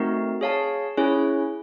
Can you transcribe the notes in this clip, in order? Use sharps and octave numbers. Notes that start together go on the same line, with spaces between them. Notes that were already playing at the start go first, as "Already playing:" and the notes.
Already playing: A3 C4 D#4 F#4 A#4
G#4 C#5 F5 A5
C#4 E4 G#4 C#5